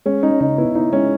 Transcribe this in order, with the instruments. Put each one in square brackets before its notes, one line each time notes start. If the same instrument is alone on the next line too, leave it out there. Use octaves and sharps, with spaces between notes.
[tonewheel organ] G#3 [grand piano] C#4
[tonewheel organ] C#4 [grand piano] D#4
[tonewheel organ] C#3 [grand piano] D#4
[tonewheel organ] B3 [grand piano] E4
[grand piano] D#4 [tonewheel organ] E4
[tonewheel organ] G#3 [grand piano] C#4